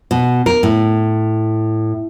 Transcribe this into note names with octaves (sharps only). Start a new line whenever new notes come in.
B2
A#4
A2